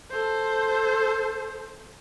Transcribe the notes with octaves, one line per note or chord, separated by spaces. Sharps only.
A4 C5